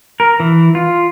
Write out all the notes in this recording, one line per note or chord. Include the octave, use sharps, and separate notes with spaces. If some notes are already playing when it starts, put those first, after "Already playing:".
A#4
E3
F4